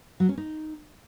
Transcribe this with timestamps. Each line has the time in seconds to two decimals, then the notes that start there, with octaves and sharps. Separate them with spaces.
0.20 F#3
0.29 C#4
0.38 D#4